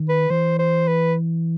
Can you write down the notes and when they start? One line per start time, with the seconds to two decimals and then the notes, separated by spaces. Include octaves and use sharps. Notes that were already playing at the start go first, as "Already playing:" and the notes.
Already playing: D#3
0.09 B4
0.30 E3 C5
0.59 C5
0.88 B4